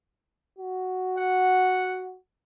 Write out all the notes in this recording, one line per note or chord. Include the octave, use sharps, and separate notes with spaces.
F#4
F#5